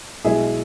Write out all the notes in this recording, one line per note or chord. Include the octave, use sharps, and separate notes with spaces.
B1 B2 G#3 E4 G#4